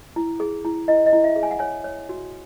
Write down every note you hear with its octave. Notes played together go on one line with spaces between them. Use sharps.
E4
G#4
E4
E4 D#5
D#5
E4
E5
G#4
G#5
F#5
C#5 G#5
C#5
F#4